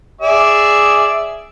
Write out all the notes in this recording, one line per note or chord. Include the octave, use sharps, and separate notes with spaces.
G#4 D5 E5